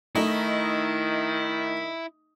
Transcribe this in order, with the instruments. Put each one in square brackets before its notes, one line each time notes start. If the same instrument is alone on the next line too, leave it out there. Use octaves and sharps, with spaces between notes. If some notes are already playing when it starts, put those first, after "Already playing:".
[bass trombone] D#3 [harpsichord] A3 [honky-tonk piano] D#4 D#5 [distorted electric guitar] E4